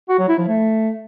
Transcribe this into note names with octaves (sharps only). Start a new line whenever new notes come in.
F#4
F#3
E4
F3
A3